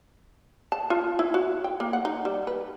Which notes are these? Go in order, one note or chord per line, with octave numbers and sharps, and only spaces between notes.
A5
F4
E4
F#4
G5
A#3
F#5
D#4
G3
B4